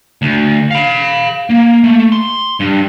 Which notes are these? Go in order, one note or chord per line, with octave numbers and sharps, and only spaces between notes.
D2
F5 B5
A#3
A3
C6
G2